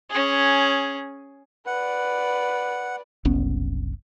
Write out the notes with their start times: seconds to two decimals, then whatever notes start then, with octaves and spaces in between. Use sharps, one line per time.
0.10 C#4 G#4
1.67 B4 D5 F#5
3.25 F#1 C2 B3 C#4